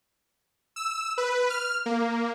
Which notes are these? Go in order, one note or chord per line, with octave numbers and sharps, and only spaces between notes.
E6
B4
F6
A#3